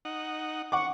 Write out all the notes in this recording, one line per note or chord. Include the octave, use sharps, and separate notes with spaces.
D#4 F#5
F#5 C#6 D6